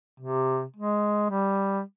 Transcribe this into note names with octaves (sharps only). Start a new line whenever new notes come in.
C3
G#3
G3